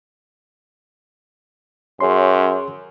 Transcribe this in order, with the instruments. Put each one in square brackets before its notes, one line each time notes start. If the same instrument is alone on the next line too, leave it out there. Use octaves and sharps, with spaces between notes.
[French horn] F#2 [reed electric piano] G#4 C#5 C6